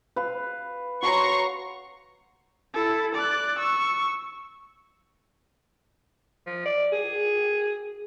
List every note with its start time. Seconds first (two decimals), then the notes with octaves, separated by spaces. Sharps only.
0.16 B4 F5
1.03 F#4 C#5 A#5 C6 C#6
2.74 E4 A4
3.15 D5 F#6
3.59 C#6 E6
6.47 F3
6.65 D5
6.92 G#4